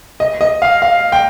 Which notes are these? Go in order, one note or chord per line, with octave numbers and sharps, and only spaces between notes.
D#5
D#5
F5
F5
G5